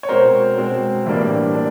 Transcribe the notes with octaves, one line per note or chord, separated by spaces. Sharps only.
C#5
B2 G#3 C4 A#4 C5
B2 G#3 C4
A2 E3 G3 A#3 D4
D4